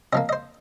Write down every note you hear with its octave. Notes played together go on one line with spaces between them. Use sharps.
C3 F3 A#3 D#5
D#5
C5